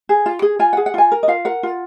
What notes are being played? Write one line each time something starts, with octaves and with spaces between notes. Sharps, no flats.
G#4
F4
G#4
F4 G#5
F#5
G#4
F#5
F4 G#5
A#4
D#5
F4 F5
A#4 F#5
F4